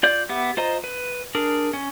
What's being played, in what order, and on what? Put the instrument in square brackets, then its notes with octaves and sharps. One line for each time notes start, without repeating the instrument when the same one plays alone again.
[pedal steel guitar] F4 D5 G6
B3 G4 E5
F4 C5 D#5 A#5
B4
D4 G#4 A#4
C#4